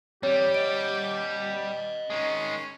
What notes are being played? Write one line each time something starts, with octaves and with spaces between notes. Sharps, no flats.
E2 G3 C4 G4 C#5
D#5 F#5 D7
D#3 G#3 C#4